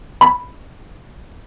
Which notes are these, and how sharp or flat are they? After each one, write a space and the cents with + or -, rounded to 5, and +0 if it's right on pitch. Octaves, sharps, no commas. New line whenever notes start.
B5 +0